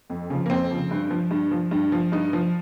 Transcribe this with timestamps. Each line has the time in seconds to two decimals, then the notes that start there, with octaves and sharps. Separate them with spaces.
0.10 F2
0.30 C#3 F3
0.46 A#3
0.50 F2 C4
0.71 C#3 F3
0.91 G2
1.11 F3
1.31 G2
1.51 F3
1.71 G2
1.92 F3
2.12 G2 D#4
2.33 F3